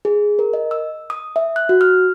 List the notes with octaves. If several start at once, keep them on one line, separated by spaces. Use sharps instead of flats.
G#4
A#4
D#5
E6
D#6
E5
F#6
F#4
F6